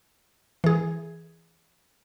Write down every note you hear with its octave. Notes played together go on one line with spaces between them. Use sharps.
E3 G#4